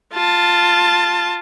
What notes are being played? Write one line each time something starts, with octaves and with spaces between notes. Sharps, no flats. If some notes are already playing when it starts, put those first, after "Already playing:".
F4 A5